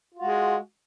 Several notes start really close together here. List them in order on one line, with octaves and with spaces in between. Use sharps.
F4 F#4 G#3